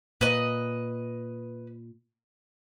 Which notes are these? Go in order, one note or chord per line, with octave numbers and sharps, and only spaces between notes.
A#2 B4 D#5